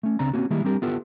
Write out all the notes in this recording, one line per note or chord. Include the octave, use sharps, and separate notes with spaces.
A3 C#4
C#2 C#3 C4 D4 A#5
A#3 C4 C#4 F#4
D#3 G3 G#3 A#3 E4
G3 C4 D4 G4 A#4
B3 E4 F4 G4 A4 B4